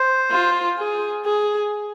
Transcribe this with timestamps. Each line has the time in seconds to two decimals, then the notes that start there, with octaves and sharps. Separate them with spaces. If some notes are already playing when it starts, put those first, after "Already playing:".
Already playing: C5
0.32 F4
0.78 G#4
1.25 G#4